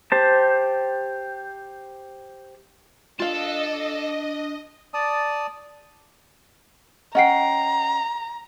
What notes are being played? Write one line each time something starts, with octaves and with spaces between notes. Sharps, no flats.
G4 C5 A5
D4 F4 A4 D#5 F5 A5
D5 A5 D#6
C#4 D#5 F#5 G5 A#5 C7